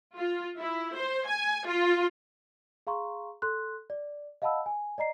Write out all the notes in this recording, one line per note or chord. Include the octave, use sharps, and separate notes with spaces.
F4
E4
C5
G#5
F4
G#4 F5 A#5 C6 C#6
A4 C6 F#6
D5
D#5 F5 F#5 A5 B5 E6
G#5
D5 D#5 A#5 C7